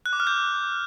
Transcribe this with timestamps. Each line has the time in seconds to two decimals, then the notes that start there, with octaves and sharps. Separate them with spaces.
0.06 F#6
0.13 D6
0.20 F6
0.27 G6